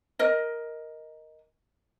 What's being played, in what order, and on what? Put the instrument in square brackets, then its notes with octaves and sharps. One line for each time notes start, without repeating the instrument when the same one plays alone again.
[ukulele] A#4 D#5